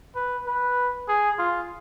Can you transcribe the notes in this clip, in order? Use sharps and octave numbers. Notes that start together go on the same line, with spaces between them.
B4
B4
G#4
F4